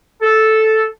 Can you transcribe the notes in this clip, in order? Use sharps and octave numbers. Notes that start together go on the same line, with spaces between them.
A4